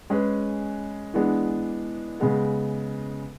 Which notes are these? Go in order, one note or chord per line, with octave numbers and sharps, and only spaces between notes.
G#3 C#4 G#4 B4
E3 G#3 B3 D4
C#3 G#3 B3